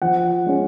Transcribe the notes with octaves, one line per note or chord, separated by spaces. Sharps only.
F3 F#5
G#3 C#4